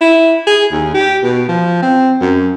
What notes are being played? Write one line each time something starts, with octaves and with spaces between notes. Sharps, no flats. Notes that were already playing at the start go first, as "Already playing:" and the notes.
E4
G#4
D#2
G4
B2
F3
C4
F#2